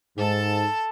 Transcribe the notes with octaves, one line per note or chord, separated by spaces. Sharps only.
G#2 A4 A5